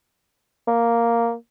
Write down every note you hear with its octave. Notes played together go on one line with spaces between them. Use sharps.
A#3